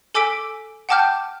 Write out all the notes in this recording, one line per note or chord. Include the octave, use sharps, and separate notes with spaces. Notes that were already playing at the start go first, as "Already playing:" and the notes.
A4 G#5 D6 E6 B6 D7
F#5 G5 A5 D6 F6 G6